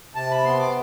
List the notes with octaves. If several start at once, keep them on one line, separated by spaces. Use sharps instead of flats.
C3 A5
B5
B3 C6
D6